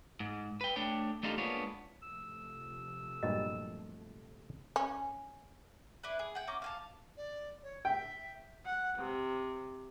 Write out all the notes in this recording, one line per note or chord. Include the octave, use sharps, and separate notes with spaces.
G#2
B4 G5
A3 D4 C#5 G5
A3 D4 D#4 F4 G4 A4
G#3 A#3 B3 D4 F4 C#5
C3 F3 A3 E6
G2 A#2 F#3 D#5
C#4
D4 E4 B4
G#4
F#5 G5
C#4 A#5 D6
F5 G#5 A5
D5
C#5
E5 G5
F#5
C3